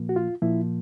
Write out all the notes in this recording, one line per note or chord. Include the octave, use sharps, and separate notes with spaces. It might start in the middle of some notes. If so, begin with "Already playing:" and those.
Already playing: A#2 F3 A#3
F#4
F4
A#2 F3 A#3 E4